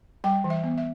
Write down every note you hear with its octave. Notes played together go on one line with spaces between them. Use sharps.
G3 G5
E3
E5
B3
E5